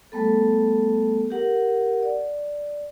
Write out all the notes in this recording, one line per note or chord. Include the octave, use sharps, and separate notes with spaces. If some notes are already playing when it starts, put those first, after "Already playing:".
G3 A3 B3 A4
G4 A#4 F#5
D5